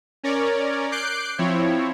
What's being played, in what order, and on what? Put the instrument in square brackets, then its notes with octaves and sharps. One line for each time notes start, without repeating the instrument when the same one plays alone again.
[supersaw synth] C#4 A#4 C#5 D5
D6 F#6 G6 C7 D7
F3 C4 E4 C#5